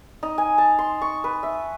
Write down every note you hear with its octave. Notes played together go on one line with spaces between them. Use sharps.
D#4
G#5
A5
C6
C#6
B4
E5